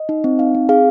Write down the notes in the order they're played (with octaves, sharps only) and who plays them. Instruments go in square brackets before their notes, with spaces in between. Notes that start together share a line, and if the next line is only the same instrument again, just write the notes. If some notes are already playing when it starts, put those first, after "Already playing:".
Already playing: [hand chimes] D#5
D#4
C4
D#4 F5
C4
G#4 F5